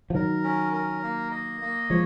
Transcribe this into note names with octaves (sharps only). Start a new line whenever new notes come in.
F3
D#3 F#3 A#4
C#4
A#4
A#3
D#5
A#3
F3 G#3 C#5